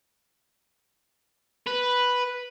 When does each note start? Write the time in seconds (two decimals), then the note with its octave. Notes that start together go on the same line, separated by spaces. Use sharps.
1.67 B4